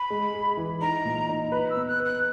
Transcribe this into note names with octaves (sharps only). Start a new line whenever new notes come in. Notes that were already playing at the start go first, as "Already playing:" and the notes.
Already playing: B5
G#3
G#4
E3
D#4 A#5
A#2
D#4
B4 B5
E6
B3
F#6
B4
F#6